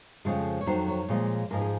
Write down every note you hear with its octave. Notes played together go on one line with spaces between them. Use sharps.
F2 C#3 F3 G#3
C#5
F2 D#3 F#3 C5
C#5
A#2 F3 G#3
G#2 F3 G#3 A#4
G#4